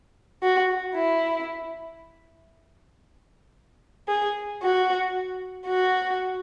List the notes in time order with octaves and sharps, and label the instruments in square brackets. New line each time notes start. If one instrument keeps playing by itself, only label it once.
[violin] F#4
E4
G#4
F#4
F#4